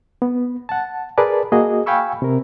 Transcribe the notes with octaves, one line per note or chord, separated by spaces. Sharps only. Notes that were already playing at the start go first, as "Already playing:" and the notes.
B3
F#5 A5
G#4 A#4 B4 D5 A5
A#3 F#4 G#4 D#5
F5 G5 G#5 B5 C#6 E6
C3 A#4